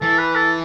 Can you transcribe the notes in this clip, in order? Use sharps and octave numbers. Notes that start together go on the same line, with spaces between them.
E3 A4
B4
A4